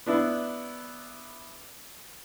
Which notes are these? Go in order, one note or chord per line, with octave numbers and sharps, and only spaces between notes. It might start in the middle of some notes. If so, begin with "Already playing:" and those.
B3 D4 E4